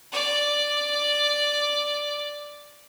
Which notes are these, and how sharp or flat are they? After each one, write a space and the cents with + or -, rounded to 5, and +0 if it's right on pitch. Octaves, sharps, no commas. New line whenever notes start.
D5 +0